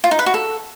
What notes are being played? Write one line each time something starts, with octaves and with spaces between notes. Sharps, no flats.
F4
D#4
B4
F#4
A4